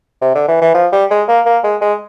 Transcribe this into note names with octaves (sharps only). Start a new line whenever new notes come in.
C3
D3
E3
E3
F3
G3
G#3
A#3
A#3
G#3
G#3